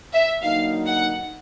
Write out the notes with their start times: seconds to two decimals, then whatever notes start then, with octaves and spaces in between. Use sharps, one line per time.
0.13 E5
0.42 D3 F#3 A#3 D#4 F5
0.86 F#5